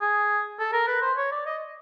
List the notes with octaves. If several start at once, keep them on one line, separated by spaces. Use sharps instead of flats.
G#4
A4
A#4
B4
C5
C#5
D5
D#5